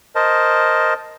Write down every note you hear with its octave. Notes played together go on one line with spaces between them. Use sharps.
A#4 C5 D#5 A5